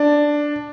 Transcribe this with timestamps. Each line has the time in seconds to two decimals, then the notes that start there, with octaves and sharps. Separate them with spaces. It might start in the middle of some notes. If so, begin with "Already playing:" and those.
Already playing: D4